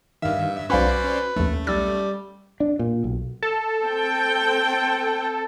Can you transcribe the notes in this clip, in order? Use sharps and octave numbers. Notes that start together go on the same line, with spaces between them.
G2 D#3 E5 F5
B1 C#4 F#4 B4 C5 D5 F5 B5
A#1 D#2 A3 C#4
B1 G3 E6 A6
D4
A#2
B1
A4
C4 G5